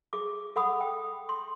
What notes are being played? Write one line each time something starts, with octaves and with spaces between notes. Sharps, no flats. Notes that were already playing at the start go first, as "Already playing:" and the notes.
G#4 D6
A4 F#5 B5 D#6
G5
C6